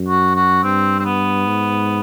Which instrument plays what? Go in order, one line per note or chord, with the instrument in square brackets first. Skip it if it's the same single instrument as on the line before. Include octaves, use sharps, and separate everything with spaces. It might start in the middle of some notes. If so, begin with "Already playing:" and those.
Already playing: [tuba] F#2
[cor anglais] F#4
F#4
[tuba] G2 [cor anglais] C4
[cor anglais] C4
B3
[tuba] G#2